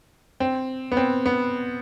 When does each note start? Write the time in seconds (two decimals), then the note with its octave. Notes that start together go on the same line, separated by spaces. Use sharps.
0.40 C4
0.92 B3
0.97 C4
1.26 B3